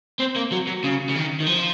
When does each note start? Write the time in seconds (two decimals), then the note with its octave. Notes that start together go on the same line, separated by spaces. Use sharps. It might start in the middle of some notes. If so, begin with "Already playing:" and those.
0.20 C4
0.36 A#3
0.52 F#3
0.67 F#3
0.84 C#3
1.09 C#3
1.15 D#3
1.40 D#3
1.47 F3